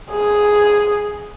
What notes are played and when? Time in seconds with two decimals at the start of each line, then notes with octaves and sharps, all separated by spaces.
0.10 G#4